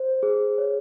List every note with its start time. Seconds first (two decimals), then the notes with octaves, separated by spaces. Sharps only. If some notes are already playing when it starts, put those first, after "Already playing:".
Already playing: C5
0.23 G#4
0.58 C#5